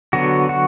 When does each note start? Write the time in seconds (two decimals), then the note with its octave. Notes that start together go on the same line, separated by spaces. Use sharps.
0.13 D3 F#3 B3 F#4
0.49 F#4